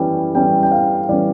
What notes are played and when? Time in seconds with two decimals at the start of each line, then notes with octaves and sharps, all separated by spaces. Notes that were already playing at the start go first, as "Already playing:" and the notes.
Already playing: E3 G3 C#4 G5
0.35 E3 G3 C#4 G5
0.63 G5
0.71 F5
1.09 E3 G3 C#4 D5